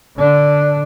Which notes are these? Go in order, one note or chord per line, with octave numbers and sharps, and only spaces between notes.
D3 D4